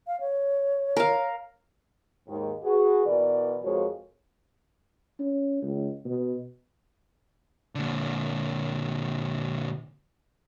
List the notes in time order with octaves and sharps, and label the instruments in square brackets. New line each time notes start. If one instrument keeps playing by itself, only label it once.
[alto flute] F5
C#5
[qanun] A#4 F5
[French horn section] D#2 G#2 D#3
F#4 G#4 B4
B2 E3 A#4 D5
F2 F3 G#3 F#4 A#4 C#5
[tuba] C#4
C#2
B2
[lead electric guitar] A#2 D3